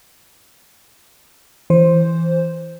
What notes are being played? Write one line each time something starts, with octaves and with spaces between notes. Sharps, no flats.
E3 C5